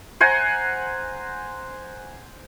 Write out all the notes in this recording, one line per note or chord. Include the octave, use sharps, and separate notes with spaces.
C5 F#5 G#5 A#5